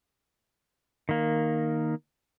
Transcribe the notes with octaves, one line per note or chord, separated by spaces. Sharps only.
D#3 A#3